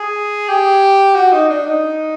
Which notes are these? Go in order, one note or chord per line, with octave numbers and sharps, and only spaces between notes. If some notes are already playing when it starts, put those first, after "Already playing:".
Already playing: G#4
G4
F#4
D#4
D4
D#4